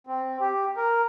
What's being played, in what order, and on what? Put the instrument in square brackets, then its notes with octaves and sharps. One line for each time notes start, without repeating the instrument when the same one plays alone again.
[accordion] C4
G4
A#4